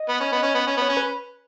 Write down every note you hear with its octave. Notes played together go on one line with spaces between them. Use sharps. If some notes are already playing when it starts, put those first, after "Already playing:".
Already playing: D#5
B3
C#4
B3
C#4
B3
C#4
B3 C#5
C#4
B4